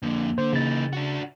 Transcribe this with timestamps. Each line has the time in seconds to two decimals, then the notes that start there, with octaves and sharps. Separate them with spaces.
0.02 F2 D3 A#3
0.38 D3 C5
0.53 C#3 E3 D#4 A6
0.93 D4 F#4